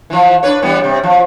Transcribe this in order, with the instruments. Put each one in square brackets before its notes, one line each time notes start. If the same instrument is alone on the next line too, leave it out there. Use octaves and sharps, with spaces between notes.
[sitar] E3 F3
D4 B4 C#5
E3 G3 B3
C3 G3
F3